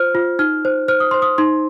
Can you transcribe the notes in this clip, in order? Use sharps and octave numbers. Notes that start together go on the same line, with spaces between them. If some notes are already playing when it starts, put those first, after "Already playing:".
Already playing: F4 C5 F6
F4
D#4 F6
C5
C5 F6
D#6
C5 C6
D#6
D#4 C6